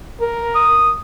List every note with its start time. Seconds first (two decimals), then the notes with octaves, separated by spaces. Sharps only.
0.21 A#4
0.55 D#6